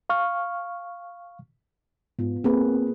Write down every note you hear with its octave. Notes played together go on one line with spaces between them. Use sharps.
F5 C#6 F6
G#2 B3 F4
A#3 C4 G#4 B4